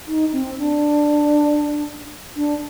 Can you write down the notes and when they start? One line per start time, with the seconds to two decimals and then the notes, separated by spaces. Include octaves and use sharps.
0.07 D#4
0.33 C4
0.58 D4
2.36 D4